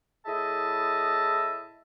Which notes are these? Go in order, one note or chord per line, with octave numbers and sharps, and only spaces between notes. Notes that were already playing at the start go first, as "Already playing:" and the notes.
A2 E4 G#4 D#5 E5 A5